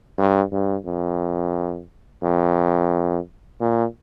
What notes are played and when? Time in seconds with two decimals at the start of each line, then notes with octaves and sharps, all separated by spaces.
0.18 G2
0.52 G2
0.86 F2
2.23 F2
3.61 A#2